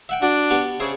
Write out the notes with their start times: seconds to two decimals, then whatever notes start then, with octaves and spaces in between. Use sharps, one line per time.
0.09 E5 F#5 G5
0.22 D4 F#4
0.50 B3 G4 C#6
0.80 C#3 G#4 C5 E5